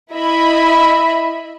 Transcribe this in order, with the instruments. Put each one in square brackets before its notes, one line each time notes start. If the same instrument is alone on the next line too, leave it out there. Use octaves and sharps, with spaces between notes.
[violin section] E4 D#5 E5 B5